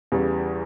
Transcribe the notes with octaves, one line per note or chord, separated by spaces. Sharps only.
E2 C#3 E3 G3